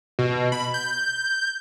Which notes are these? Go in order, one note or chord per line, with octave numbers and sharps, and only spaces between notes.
B2
B5
G6